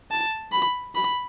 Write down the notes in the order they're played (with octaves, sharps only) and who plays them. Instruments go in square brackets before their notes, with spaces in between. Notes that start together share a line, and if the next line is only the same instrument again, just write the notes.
[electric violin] A5
B5
B5